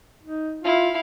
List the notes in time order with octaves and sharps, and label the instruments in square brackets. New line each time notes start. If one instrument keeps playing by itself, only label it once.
[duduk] D#4
[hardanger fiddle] E4 F5 [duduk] F4